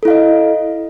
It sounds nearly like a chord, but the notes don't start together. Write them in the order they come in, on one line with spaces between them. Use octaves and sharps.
A4 E4 F5 D#5